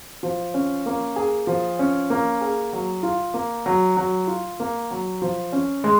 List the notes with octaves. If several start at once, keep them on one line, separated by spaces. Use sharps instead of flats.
F3
C#4
A#3
G#4
F3
C#4
A#3
G#4
F#3
F4
A#3
F#3
F#3
F4
A#3
F#3
F3
C#4
G#3